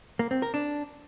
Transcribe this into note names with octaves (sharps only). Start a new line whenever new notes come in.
A#3
C4
A#4
D4